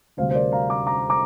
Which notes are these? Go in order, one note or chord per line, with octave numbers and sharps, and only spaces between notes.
D2 C3 G3 C5 F5
C5
A#4 D5
F5 A#5
A#5 D6
A#5 D6
A#5 D6